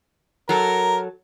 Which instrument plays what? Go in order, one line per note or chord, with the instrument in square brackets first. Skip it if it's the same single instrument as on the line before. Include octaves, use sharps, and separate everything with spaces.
[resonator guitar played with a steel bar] F#3 A4 [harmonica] A#4